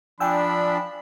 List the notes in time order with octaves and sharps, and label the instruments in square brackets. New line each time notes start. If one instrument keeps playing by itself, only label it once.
[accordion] F3 D4 [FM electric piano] G5 G#5 E6 [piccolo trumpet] B5